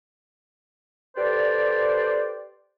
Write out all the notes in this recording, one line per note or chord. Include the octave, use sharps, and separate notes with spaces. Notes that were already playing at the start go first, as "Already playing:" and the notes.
G4 A4 B4 C5 D5